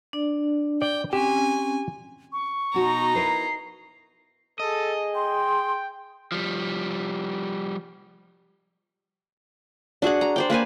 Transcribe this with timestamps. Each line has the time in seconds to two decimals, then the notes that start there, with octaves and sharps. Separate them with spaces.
0.13 D4 D5
0.82 D5 G5
1.13 C4 C#4 G4 G#5
2.33 C#6
2.74 B2 D#4 F#4 A#5
3.15 E4 A#4 B4 C7
4.60 G#4 A4 D#5
5.15 G5 C6
6.32 F3 G3
10.02 D4 F#4 G#4 F#5
10.21 A#5
10.36 C5 D5 G5
10.50 A#3 B4 C5 G#5